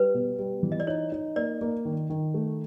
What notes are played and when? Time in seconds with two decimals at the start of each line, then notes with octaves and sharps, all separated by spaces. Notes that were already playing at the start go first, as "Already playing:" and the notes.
Already playing: G3 B4
0.14 B2
0.39 G3
0.63 E3
0.72 D#5
0.80 D5
0.87 D#4 C#5
1.12 D#4
1.36 A#3 D5
1.61 A#3
1.85 D#3
2.10 D#3
2.34 A3